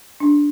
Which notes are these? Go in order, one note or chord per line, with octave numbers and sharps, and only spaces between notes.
D4